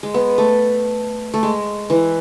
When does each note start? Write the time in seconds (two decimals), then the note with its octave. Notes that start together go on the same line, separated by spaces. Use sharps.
0.03 G#3
0.14 B3
0.38 A3
1.34 A3
1.43 G#3
1.90 E3